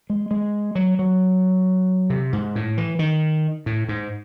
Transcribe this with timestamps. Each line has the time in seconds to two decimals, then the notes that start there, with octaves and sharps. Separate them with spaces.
0.10 G#3
0.31 G#3
0.75 F#3
0.99 F#3
2.10 C3
2.33 G#2
2.55 A2
2.77 E3
2.99 D#3
3.66 A2
3.89 G#2